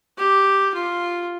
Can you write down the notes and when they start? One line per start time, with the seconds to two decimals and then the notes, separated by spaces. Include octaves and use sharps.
0.18 G4
0.74 F4